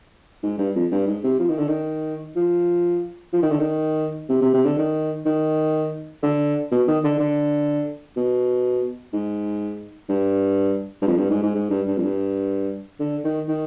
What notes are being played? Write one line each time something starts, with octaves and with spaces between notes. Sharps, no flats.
G#2
G2
F2
G2
G#2
C3
F3
D#3
D3
D#3
F3
F3
D#3
D3
D#3
C3
C3
C3
D3
D#3
D#3
D3
B2
D#3
D3
D3
B2
G#2
G2
G2
F2
G2
G#2
G#2
G#2
G2
G2
F2
G2
D3
D#3
D#3